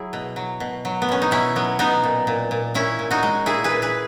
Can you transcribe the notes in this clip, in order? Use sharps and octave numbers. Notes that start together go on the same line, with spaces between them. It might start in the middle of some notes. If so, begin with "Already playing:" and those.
Already playing: F#3 E4 G#4
B2
F#3
B2
F#3
B3
B2 C#4
D#4
B2 C#4 E4
F#3 B3
B2 B3 D#4
A#2
A#2
A#2
A#2 C#4 E4
A#2
D#4 F#4
G#3
A#2 E4 G#4
G#4 B4
A#2
G#4 B4